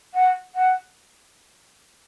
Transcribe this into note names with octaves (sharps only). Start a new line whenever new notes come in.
F#5
F#5